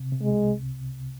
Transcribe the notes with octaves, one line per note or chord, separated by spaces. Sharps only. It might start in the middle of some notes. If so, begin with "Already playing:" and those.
Already playing: C3
C3
G#3
C2